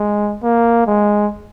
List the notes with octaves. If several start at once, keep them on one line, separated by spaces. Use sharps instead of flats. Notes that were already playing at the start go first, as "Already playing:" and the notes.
Already playing: G#3
A#3
G#3